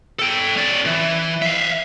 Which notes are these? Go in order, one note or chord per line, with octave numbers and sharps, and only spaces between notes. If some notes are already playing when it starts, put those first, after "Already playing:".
A4 G5
C#4 D5
E3
E5 F5